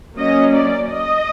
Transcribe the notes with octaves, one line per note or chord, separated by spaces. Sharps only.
F#3 A#3 C#4 D#5
D5
D#5